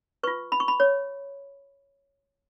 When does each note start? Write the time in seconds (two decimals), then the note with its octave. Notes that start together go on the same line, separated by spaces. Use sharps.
0.23 F4 B4 C#6
0.52 B5
0.60 C#6
0.68 B5
0.80 C#5